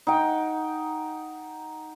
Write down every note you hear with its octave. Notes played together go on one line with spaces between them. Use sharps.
D#4 F#5 G5